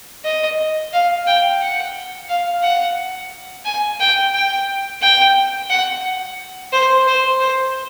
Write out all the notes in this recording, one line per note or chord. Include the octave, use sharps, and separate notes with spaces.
D#5
F5
G5
F#5
F5
F#5
G#5
G5
G5
G5
F#5
C5
C5
C5